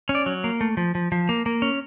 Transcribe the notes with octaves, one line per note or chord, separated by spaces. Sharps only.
C#4
D5
F#3
A#3
A3
F3
F3
F3
A#3
A#3
C#4